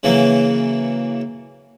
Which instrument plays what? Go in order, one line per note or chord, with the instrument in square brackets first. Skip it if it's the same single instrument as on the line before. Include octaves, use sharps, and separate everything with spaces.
[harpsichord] C#3 E3 F#3 A#3